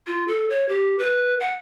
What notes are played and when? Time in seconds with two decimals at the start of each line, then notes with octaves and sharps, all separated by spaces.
0.07 F4
0.28 A4
0.50 C#5
0.69 G4
0.99 B4
1.40 F#5